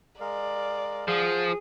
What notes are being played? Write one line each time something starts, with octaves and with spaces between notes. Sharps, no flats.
G#3 A#4 D5 F5
F3 G#4 F5 F#5